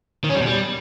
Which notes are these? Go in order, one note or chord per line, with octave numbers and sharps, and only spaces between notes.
D#3
C#4
G3
B2
G3